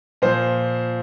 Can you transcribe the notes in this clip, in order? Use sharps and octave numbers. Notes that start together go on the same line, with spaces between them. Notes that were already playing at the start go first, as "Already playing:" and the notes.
A#2 F3 C5